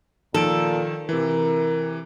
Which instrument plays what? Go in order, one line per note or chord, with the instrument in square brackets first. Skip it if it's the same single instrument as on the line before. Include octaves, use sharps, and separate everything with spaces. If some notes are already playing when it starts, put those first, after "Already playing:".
[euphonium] A#2 [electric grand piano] D#3 F3 D7 [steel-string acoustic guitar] A4
[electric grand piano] C3 E3 [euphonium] A#4